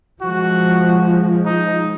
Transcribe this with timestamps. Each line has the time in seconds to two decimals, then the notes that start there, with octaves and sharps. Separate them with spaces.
0.22 F3 G#3 F#4
1.46 D#4